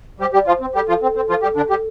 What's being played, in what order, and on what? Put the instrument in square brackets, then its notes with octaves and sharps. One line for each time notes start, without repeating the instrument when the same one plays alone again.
[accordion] G3 G4 [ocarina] C5
[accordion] G3 G4 [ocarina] D5
[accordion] F3 F4 [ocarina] C5
[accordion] C4
[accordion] G3 G4 [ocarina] A4
[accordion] F3 F4
C4
C4
F3 F4
G3 G4
D3 D4
G3 G4